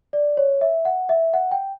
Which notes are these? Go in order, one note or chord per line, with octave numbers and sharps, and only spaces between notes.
D5
C#5
E5
F#5
E5
F#5
G5